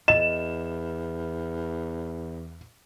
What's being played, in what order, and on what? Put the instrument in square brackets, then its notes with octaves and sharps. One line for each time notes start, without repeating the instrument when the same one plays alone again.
[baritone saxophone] E2 [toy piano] D#5 [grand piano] E7